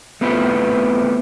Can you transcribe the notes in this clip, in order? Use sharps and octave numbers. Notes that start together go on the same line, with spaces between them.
A3 B3 C4 E4 F4 B4